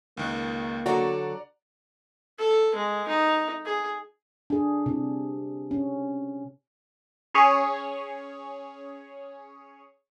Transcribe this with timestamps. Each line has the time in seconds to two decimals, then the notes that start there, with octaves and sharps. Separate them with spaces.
0.17 C#2 D#3 A#3 F#6
0.86 D3 F#3 F#4 A4 D5 F#5 A#5
2.38 A4
2.75 G#3
3.08 D#4
3.65 G#4
4.50 D4 G#4
4.86 C3
5.71 C#4
7.34 C#4 G#4 C#5